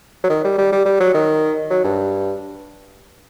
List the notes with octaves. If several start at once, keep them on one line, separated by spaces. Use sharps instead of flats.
F#3
D#3
G3
G3
G3
G3
F#3
D#3
F#3
G2